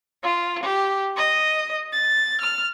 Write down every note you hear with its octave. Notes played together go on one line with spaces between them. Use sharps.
F4
G4
D#5
A6
F6